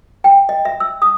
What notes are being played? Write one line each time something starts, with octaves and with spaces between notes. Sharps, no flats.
G5
D#5
E5
E6
D#6